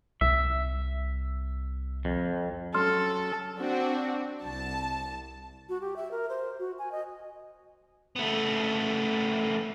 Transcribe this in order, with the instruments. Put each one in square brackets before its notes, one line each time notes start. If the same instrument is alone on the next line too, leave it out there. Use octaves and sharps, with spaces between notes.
[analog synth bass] C2 [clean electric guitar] E5
[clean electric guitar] F2
[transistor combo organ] F#3 C#4 [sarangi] A4 [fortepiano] C6 [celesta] F6
[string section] C4 D4 F#4
C2 A5
[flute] F#4
G4
E5
A#4
C5
F#4
G#5
D#5
[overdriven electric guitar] A3 B3